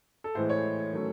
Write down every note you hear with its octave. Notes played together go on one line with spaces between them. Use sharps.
A4
A2 E3 G#3 C5
C#5
D#3 F#3 A3 C#4